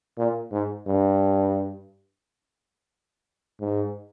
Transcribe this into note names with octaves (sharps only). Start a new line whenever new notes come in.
A#2
G#2
G2
G#2